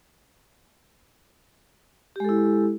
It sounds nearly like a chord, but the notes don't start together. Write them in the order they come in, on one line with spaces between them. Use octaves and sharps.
G4 G#3 A4 E4